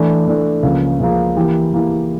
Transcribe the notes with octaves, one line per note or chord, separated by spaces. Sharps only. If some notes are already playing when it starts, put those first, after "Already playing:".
Already playing: E3 A3 D4
E3 A3 D4
C#2 C#3 F3 A#3
C#2 C#3 F3 A#3
E3 A#3 E4 G4
E3 A#3 E4 G4